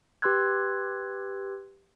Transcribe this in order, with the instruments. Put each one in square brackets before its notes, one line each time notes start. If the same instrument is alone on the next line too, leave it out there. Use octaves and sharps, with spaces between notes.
[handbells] G4 B4 C6 E6 F#6 G#6